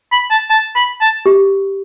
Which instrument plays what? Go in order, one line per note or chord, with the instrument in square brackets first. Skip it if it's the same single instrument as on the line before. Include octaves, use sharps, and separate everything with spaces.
[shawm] B5
A5
A5
B5
A5
[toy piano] G4